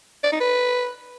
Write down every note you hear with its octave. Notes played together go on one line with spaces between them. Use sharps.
D5
D#4
B4